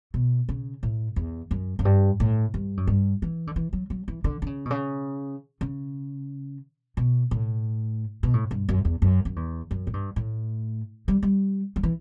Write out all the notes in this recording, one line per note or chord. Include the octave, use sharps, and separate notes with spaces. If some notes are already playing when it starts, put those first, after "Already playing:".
B2
C#3
A2
E2
F#2
F#2
G2
A2
G2
F#2
G2
E3
D3
E3
F#3
F#3
E3
D3
D3
C#3
B2
C#3
C#3
B2
A2
B2
A2
G2
F#2
E2
F#2
F#2
E2
F#2
A2
G2
A2
G3
G3
F#3
E3